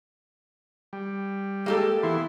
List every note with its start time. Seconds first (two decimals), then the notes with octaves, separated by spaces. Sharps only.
0.93 G3
1.66 G#3 A#3 G4 A4
2.03 E3 B3 E4 C6